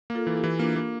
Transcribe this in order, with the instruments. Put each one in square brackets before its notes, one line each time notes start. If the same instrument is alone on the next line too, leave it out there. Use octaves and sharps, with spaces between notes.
[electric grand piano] A#3
[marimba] F4 A4
[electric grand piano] E3
[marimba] A4
E4 G4
[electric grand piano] E3
[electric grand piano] A#3 [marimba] D4 F4
[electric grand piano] A#3